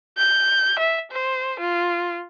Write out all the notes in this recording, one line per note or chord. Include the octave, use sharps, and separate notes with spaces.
G6
E5
C5
F4